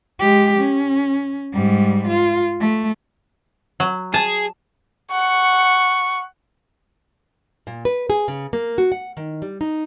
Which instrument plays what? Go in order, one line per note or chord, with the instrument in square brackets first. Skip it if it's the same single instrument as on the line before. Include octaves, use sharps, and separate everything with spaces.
[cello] G#3 G4
C#4
G#2 G3
F4
A3
[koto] F#3
[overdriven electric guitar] G#4 [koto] A5
[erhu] F#5 [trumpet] C#6
[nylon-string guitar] A#2
B4
G#4
C#3
A#3
F#4
F#5
D#3
G3
D#4